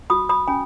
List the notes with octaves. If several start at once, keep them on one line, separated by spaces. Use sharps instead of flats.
F#4 B5 D#6
B5 D#6
C#4 G#5 B5